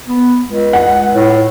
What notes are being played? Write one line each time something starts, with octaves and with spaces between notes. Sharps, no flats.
B3
C#2
F#5
A2